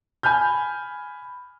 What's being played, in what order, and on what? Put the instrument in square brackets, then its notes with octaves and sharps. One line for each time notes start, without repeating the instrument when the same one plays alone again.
[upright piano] G#5 B5 F6 G6